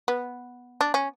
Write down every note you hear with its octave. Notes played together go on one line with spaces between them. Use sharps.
B3
D4
C#4